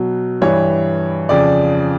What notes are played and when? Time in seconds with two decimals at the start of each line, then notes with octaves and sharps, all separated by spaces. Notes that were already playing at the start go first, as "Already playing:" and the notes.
Already playing: B2 F#3
0.41 G2 E3 G3 C#5
1.29 F2 C#3 F3 D5